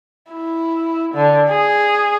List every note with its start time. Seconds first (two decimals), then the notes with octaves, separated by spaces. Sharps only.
0.32 E4
1.14 D3
1.50 G#4